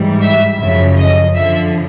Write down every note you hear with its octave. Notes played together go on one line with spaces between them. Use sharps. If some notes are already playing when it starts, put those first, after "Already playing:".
Already playing: G#2 E3 G3
E5
F#2 C#3 F3 E5
D#5
F2 D3 F3 E5